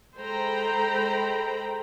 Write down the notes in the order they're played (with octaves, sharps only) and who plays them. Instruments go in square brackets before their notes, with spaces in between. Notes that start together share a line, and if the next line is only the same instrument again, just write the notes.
[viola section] G#3 A4 C5 G5 A#5 B5